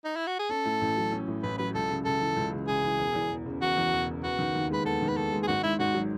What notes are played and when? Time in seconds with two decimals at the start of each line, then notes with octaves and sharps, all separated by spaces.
0.05 D#4
0.16 E4
0.27 F#4
0.39 G#4
0.49 C#4 A4
0.65 A2
0.81 A1
0.97 F#3
1.12 C#4
1.28 A2
1.43 A1 B4
1.58 F#3 B4
1.75 C#2 A4
1.90 C#3
2.05 C#2 A4
2.21 E3
2.37 C#2
2.52 C#3
2.68 C#2 G#4
2.84 E3
2.99 E1
3.15 E2
3.30 E1
3.46 C#3
3.61 E1 F#4
3.77 E2
3.93 E1
4.08 C#3
4.23 B3 F#4
4.39 D#3
4.55 D#2
4.70 G#3 B4
4.85 B3 A4
5.02 D#3
5.09 B4
5.16 D#2 A4
5.33 G#3
5.43 G#4
5.48 G#1 F#4
5.64 G#2 E4
5.79 G#1 F#4
5.94 F#3